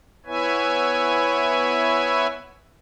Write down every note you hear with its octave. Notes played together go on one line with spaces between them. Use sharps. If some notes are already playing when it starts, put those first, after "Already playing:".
B3 E4 B4 C#5 E5 G#5